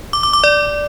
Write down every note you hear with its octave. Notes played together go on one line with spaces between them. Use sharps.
D6
D6
D6
D5